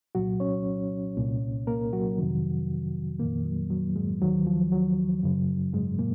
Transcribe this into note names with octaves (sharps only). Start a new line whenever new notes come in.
C2 A#2 F#3 F#4
C#4 C#5
C2 A#2
A#3 A#4
F#3 F#4
F2 C3 D#3
F2 A#2 D#3 A#3
F#3
F#3
G#2 G#3
D#2 D#3 F#3
F3
F#3
F#2 C#3
G#2 G#3
A#2 A#3